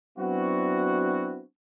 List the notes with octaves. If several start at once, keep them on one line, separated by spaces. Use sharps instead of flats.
F#3 B3 C4 D4 E4 F#4